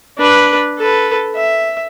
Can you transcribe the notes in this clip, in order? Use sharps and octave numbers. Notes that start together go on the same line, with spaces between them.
D4 B4
A4 B4
E5